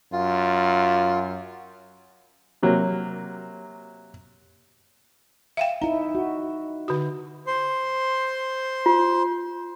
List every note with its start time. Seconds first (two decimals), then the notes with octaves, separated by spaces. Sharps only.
0.12 F#2 F4
2.63 C3 F#3 A#3
5.57 E5 F5 G5
5.82 D#4 E4 A#5
6.15 F#4
6.88 D3 F#4
7.47 C5 C6
8.86 F4